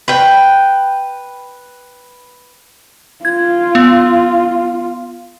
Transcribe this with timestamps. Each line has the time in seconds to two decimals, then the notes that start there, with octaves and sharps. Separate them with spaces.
0.08 B4 G5
3.25 F4 G#6
3.75 B3